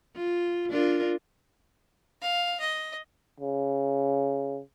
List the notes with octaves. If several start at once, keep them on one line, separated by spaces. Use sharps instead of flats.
F4
D4 F4 A#4
F5
D#5
C#3